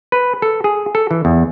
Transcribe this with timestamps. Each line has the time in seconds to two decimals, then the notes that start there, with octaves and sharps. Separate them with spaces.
0.12 B4
0.42 A4
0.64 G#4
0.95 A4
1.11 E3
1.25 E2